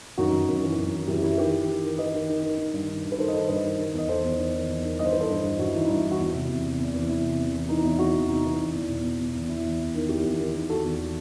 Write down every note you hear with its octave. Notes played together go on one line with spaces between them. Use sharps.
F#2 D#4 F#4
F#2
F#2
E3
F#2
E3
F#2 E4 G4
E3 E4 G4
D#3 G4 B4
D#3
D#3
D#3
D#3 B4 D#5
D#3
D#3
D#3
D#3
G2
D#3
G2
B4
D#3 A4 C5
D#5
D#3 A4 C5
G2 B4 D#5
D#3
D#3
E2 D#5
D#3 A4 C5
E2
D#3
D#3
E2
D#3
G2 D#5
C5
E3 B4
A4 C5
G2
G2
G2 F#4
E4
E3 D#4
G2 E4
E3
F#4
E2 E4
C3
E2
C3
E2
E3
C3 E4
C3
E2
E3
E3 D#4
E2 E4
E3 D#4 F#4
E2
C3 D#4
E3
E2
E2
B2
B2
B2
E2
E2 E4
E2
E2
D#3
E2 E4 G4
E2
D#3
D#3
E2 F#4 A4
E2